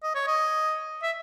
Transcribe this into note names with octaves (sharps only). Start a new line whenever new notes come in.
D#5
C#5
D#5
E5